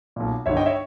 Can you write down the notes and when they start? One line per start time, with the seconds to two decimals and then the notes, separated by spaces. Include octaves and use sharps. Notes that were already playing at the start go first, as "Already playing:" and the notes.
0.16 B1 A#2
0.46 G1 G2 D#3 C#5 E5
0.57 D#5 G5
0.66 C#5 E5